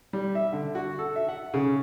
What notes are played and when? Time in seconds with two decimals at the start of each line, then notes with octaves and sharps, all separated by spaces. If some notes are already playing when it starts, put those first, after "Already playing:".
0.13 G3
0.35 E5
0.53 D3
0.75 F#4
0.99 A4
1.16 E5
1.28 F#5
1.54 C#3